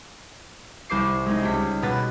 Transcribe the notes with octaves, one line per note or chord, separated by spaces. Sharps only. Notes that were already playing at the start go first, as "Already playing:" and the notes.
C2 C5 D6 C7
G#3 C4 D#4
C#2 G4 B6
B2 B3 A6 B6